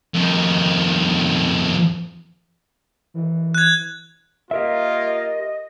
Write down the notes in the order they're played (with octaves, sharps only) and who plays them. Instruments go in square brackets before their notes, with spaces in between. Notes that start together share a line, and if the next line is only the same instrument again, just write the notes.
[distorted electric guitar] F2 D#3
[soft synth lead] E3
[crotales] F#6 G#6
[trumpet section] A#3 F4 [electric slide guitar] G4 A#4 E5 [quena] D#5